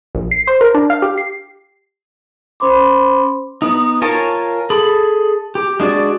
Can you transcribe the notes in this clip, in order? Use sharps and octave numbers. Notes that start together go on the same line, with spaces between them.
A#1
C7
C5
A#4
D4
F5
G4
C7
C#4 C5 B5 C6 D6
B3 D#4
F4 A#4 C#5 G#5 A5
G#4 A4 B5
G4
G#3 D4 F#4 D5